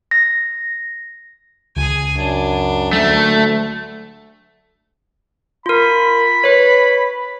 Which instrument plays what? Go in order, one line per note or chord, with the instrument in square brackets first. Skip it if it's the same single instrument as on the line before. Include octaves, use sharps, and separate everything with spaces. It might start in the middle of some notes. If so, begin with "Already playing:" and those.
[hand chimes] A#6
[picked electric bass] C#2 [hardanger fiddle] G#4 G#5
[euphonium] F#2 [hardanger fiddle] D4
[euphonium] D2 [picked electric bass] F#3 [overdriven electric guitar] A3
[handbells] F4 A#4 [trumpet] B5
[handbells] B4 C#5